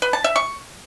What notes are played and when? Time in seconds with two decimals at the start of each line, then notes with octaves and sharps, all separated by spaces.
0.02 B4
0.13 A5
0.24 E5
0.36 C#6